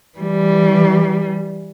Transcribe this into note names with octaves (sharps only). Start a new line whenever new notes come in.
E3 G3